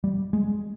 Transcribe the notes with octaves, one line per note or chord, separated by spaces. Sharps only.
G3
G#3